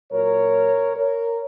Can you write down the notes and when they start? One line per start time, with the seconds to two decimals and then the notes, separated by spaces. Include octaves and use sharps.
0.11 A#2 F#3 A#4 C#5
0.97 A#4 C#5